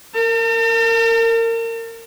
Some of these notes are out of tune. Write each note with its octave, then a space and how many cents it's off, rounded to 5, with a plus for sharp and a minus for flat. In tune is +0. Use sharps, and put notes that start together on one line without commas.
A#4 -25 A5 +45